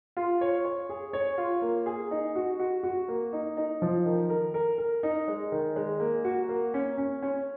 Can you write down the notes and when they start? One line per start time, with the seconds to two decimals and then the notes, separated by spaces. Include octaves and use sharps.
0.17 F4
0.41 C#5
0.65 C#5
0.89 G#4
1.13 C#5
1.38 F4
1.62 A#3
1.86 G#4
2.11 D#4
2.36 F#4
2.59 F#4
2.83 F#4
3.08 A#3
3.33 D#4
3.57 D#4
3.82 F3
4.06 D#3
4.30 A#4
4.54 A#4
4.78 A#4
5.03 D#4
5.28 G#3
5.52 D#3
5.76 G#3
6.00 A#3
6.25 F#4
6.49 A#3
6.74 C#4
6.98 C#4
7.22 C#4